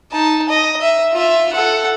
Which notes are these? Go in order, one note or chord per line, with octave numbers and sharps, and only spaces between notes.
D#4 A5
D#5
E5
F4 E5
A4 F#5